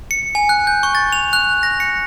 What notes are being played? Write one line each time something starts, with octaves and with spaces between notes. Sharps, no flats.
C#7
G#5
F#6
G6
C#6
A6
F7
F#6
A#6
C#7